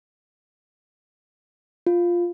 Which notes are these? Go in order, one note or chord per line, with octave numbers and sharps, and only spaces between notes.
F4